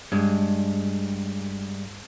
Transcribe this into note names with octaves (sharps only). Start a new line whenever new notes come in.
G2 G#3